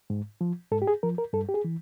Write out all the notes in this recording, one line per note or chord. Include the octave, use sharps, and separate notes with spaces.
G#2
F3
G#2 A4
G4
G#4
F3 A#4
A#4
G2 A4
G4
G#4
E3